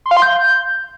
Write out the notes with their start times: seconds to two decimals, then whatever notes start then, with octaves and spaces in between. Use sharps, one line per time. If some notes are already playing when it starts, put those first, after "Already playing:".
0.06 C6
0.11 F5
0.17 C6
0.22 G6